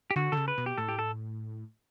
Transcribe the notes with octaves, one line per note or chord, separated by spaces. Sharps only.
G4
D3 F#4
C#3 D3 A4
B4
B2
G4
A2 A4
G4
A4